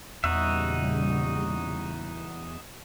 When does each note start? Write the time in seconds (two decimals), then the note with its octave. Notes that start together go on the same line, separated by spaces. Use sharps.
0.24 E2 A#2 C#3 G3 D#4 F#4 E5